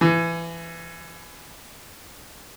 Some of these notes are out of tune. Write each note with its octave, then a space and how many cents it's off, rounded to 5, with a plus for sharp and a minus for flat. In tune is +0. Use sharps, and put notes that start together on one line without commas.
E3 +25